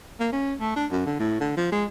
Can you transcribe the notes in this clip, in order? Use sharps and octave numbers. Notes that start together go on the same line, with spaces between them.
A#3
C#4
A3
D4
F#2
D3
A2
D3
F3
G#3